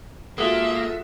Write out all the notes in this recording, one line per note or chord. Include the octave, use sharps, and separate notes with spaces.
G#3 A#3 F4 F#4 A4 E5 D#6